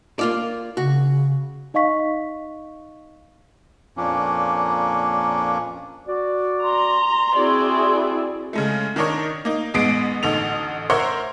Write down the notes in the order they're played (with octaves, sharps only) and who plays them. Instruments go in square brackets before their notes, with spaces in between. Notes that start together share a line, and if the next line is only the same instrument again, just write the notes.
[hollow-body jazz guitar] A#3 F4 D5
[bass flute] C#3 [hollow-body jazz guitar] F#4
[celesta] D#4 D#5 F5 C#6 B6
[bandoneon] F2 A#2 A#3 C#4 D4
[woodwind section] F#4 D5
[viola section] A#5 [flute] C6
[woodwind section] C4 F#4 [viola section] E4 G#4 D5
[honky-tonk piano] C#3 G#3 A3
D#3 D4 D#4 A#4 C#5
A#3 D#4
A1 G#3 B3 C7 D7
A1 D2 D#4 A4 F7
A#4 C5 C#5 E5 F#5 C6